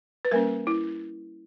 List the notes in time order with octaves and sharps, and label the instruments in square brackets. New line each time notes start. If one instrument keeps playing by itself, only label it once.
[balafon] B4
G3 A#3 C#4 A#4
E4